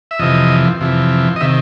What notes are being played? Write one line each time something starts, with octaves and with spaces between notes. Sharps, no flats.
E5
F2 C3 E3 D#5
F2 C3 E3
D#5
C3 D#3 E5